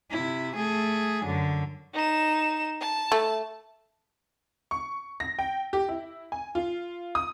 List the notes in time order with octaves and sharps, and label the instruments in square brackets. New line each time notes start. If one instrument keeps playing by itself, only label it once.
[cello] C3 E4
A3 G#4
F#2 D3
[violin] D#4 E7
A5
[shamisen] A3
[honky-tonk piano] C#6
A#6
G5
G4
E4
G#5
F4
D#6